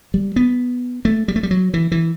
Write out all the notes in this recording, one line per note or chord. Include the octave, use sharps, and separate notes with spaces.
G3
B3
A3
G3
A3
G3
F#3
E3
E3